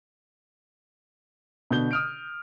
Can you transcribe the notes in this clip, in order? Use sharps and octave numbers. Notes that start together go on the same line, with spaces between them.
B2 D3 G6 G7
D#6 F6 D7